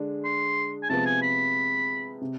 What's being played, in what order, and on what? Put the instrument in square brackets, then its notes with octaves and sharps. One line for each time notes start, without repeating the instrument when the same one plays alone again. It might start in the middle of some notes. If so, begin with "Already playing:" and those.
Already playing: [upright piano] D3 G#3 D4
[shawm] C6
G#5
[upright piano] C3 F3 G#3 B3 [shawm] A5
[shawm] G#5
B5
[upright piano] C3